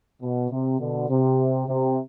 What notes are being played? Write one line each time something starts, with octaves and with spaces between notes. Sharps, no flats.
B2
C3
B2 D3
C3
C3